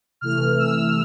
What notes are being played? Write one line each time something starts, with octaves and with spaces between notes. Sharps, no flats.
C3 E3 A3 F6
E6